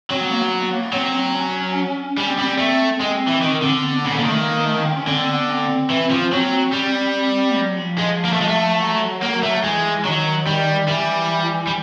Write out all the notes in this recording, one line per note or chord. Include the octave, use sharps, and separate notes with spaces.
F#3 C4
B3
A#3
B3
B3
A#3
B3
F#3 C4
C4
C#4
G3 C#4
C4
G3 C4
C4
A3
G#3 C4
E3
D#3
D3
B3
C#3 B3
D3 A#3
D#3 A3
A#3
A3
A#3
C4
C#4
D3 C4
B3
C4
E3
F3
F#3 C4
G3
F#3
F3
G#3
A#3
A3
G#3
A3
F#3
A#3
A3
E3 G#3
D#3 F#3
G3
E3 G3
G3